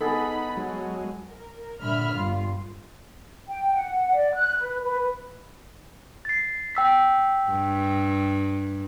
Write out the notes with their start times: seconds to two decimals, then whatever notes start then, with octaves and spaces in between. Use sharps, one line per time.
0.01 B3 D#4 G#4 A4 F#5 B5
0.57 F#3 G#3
1.27 A#4
1.80 G2 A#2 D3 E5 B5 F6
2.13 G1 G2 G3 F4
3.49 G5
3.75 F#5
4.12 D5
4.35 F#6
4.60 B4
4.83 B4
6.25 A6 C7
6.75 G5 E6 B6
7.50 G2